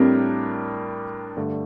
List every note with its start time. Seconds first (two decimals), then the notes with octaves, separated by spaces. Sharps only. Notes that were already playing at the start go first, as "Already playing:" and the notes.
Already playing: A2 G3 C4 D4 G4 A#4
1.37 G2 D3 A3